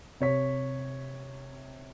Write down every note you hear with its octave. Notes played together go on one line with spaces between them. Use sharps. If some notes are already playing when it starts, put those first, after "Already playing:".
C3 C#5 B6